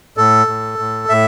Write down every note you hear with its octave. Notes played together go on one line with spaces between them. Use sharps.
A2 A4
A2
A2
A2 E5